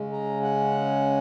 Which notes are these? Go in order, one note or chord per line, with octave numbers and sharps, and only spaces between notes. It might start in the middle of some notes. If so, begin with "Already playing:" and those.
Already playing: C#3 G#3 C#4
A#5
F#5